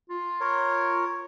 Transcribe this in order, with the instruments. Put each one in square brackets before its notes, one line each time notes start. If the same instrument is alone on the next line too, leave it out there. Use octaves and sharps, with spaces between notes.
[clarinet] F4
[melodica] A#4 C#5